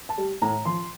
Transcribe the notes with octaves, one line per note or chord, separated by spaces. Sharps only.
A5
G3
A2 A#5
F3 C6